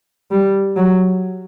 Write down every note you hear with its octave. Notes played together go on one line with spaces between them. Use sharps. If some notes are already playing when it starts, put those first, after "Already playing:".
G3
F#3